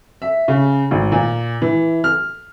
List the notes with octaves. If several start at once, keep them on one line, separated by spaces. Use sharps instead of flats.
E5
C#3
G#1
A#2
E3
F6